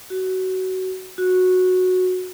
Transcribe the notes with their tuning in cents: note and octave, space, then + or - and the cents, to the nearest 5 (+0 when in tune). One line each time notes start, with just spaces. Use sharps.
F#4 +20
F#4 -10